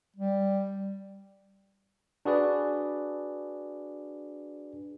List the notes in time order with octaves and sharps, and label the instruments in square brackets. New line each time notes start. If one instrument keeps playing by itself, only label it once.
[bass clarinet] G3
[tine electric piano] D4 F#4 G#4 B4 D5